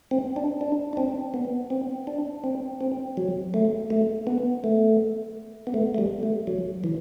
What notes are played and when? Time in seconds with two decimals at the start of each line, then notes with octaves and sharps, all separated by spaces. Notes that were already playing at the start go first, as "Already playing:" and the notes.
0.11 C4
0.36 D4
0.61 D4
0.93 D4
0.97 C4
1.34 B3
1.70 C4
2.07 D4
2.44 C4
2.81 C4
3.17 F#3
3.54 A3
3.90 A3
4.27 B3
4.64 A3
5.67 B3
5.74 A3
5.95 A3
5.98 G3
6.23 A3
6.47 F#3
6.84 E3